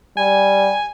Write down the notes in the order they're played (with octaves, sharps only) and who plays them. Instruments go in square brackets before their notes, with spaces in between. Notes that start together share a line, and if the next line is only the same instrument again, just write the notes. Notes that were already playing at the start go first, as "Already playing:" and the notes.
[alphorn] G3 [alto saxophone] G#5